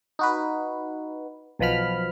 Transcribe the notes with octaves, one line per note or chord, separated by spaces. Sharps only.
D#4 F#4 B4
B1 B2 F3 B5 F6